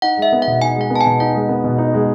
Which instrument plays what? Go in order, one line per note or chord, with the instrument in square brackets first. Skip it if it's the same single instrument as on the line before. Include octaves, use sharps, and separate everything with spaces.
[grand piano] D#4 [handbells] F#5
[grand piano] G#3
[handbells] E5
[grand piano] B3
[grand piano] B2 [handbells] F#5
[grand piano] D#4 [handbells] G#5
[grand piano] G#3 [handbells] F#5
[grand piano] B3
[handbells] A5
G#5
[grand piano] B2
[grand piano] D#4 [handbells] F#5
[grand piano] G#3
B3
B2
D#4
G#3